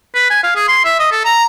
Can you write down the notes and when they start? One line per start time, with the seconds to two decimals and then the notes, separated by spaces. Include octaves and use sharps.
0.15 B4
0.30 G#5
0.44 F5
0.56 G#4
0.68 C6
0.85 E5
0.99 D#5
1.12 A4
1.25 A#5